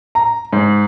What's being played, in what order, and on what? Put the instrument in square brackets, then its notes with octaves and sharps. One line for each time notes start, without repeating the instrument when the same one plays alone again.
[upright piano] A#5
G#2